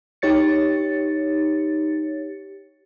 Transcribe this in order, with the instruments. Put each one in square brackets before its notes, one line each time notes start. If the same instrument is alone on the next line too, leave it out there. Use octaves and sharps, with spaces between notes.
[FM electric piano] D#4 G4 C#5 A6 C#7